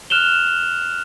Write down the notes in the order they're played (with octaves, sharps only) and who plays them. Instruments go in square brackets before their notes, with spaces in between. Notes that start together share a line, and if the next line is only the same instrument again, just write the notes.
[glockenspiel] F6 F#6 E7 F7 G7